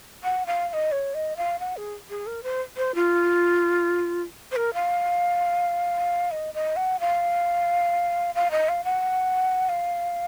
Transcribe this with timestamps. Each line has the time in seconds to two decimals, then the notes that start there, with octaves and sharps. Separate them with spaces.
0.24 F#5
0.46 F5
0.69 F5
0.73 D#5
0.92 C#5
1.14 D#5
1.37 F5
1.60 F#5
1.77 G#4
2.10 G#4
2.27 A#4
2.43 C5
2.77 C5
2.95 F4
4.52 C5
4.56 A#4
4.74 F5
6.31 D#5
6.54 D#5
6.76 F#5
7.00 F5
8.35 F5
8.51 D#5
8.69 F5
8.84 F#5
9.69 F5